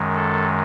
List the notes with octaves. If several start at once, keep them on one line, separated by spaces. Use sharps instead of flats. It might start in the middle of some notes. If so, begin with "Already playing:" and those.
Already playing: F#2 D#3 G#3
A4